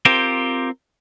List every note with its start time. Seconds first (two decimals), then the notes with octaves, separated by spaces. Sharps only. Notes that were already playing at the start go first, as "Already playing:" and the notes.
0.05 C4 F4 G4 A#4 C5